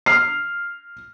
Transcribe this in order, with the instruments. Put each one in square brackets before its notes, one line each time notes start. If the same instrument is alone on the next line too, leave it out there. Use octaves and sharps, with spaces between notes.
[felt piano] F6 C7